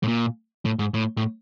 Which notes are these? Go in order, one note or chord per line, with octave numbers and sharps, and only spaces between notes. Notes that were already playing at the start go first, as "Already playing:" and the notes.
A2
A#2
A2
G#2
A2
A2